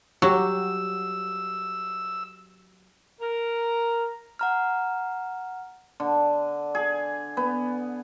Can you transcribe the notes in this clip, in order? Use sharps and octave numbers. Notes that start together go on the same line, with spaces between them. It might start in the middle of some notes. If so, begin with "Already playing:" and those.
F#3 F#4 G4 E6
A#4
F#5 A#5 F6
D3
G#4
B3